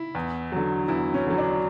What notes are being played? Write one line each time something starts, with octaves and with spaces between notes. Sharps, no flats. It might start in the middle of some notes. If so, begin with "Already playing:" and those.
Already playing: E4
E2
D3 F#3
E2 E4
C#4
D3 F#3
D4